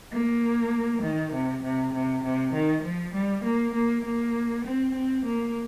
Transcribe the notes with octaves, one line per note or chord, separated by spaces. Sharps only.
A#3
D#3
C3
C3
C3
C3
D#3
F3
G3
A#3
A#3
A#3
C4
C4
A#3